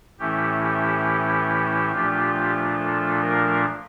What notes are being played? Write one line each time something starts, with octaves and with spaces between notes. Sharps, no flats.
A2 E3 A3 C#4 E4 G4
G4
A#2 F3 A3 D4 F4
A4
A#4